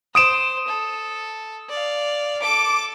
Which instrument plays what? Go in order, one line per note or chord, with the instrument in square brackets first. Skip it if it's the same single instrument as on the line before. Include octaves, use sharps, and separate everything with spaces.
[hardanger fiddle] C5 [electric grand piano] D#6 D7 E7
[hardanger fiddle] A4
D5 F5
[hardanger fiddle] A4 [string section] D6